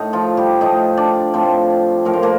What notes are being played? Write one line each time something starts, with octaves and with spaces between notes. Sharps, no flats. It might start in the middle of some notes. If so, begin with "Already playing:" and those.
Already playing: A2 D#4
F3 F4
G3 G4
A2 F3 D#4 D#5
D4 D5
A2 F3 C4 C5
A2 F3 A#4
C5
A#3 A#4